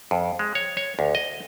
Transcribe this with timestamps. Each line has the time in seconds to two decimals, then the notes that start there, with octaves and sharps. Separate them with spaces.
0.11 F2
0.39 G#3
0.55 C#5
0.77 C#5
0.99 D2
1.15 D#5